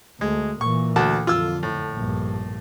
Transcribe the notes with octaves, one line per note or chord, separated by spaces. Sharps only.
D2 G#3
A#2 E3 C#6
D2 F#4 A5
F2 D3 F4 E6
A2
A#1 G2